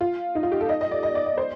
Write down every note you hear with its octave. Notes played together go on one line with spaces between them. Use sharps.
F4
D#4
F4
G4
A4
D#5
D#5
D5
D#5
D5
D5
C5